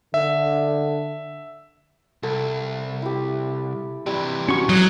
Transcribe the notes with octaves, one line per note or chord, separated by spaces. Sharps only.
D3 E5
C2 A4
E4 G4
C3 E3 G3
C#4 F#4 C#6
F#3 G#3 D#4